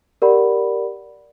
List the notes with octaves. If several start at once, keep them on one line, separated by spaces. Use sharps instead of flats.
G4 A#4 D5 F#5 B5